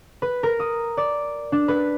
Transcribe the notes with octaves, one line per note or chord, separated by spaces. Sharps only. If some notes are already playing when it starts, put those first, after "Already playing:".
B4
A#4
D#6
D5
D4
B4